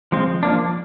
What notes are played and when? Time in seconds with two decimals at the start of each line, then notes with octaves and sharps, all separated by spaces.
0.12 F3 G#3 C4
0.43 F3 A#3 D4